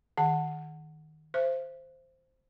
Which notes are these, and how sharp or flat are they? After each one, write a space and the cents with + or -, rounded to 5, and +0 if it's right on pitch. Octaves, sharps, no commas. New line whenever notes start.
D#3 +0 F#5 +0
C5 +0 E5 +40